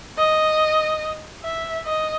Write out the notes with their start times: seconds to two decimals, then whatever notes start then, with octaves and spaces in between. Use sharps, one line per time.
0.18 D#5
1.44 E5
1.86 D#5